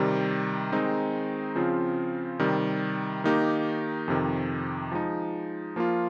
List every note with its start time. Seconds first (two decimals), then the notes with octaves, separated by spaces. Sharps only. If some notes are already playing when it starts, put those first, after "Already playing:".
Already playing: C3 D#3 G3
0.72 D#3 G#3 C4 D#4
1.55 C#3 F3 C4 F4
2.39 C3 D#3 G3
3.24 D#3 A#3 D#4 G4
4.08 F2 C3 D#3
4.91 F3 G#3 D#4
5.76 F3 A#3 F4